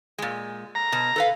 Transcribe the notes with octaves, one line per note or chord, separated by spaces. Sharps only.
A#2 G#3
A#5
B2
A4 B4 F5